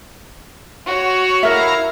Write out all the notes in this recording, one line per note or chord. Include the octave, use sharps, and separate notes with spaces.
F#4 C#5
E4 A#4 E5 F5 A#5